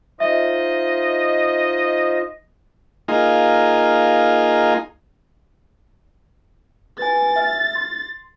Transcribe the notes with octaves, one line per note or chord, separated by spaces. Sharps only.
D#4 F4 C5 D#5 E5
A#3 D#4 F4 G#4
B4 G#5 A6
E5 F6
C6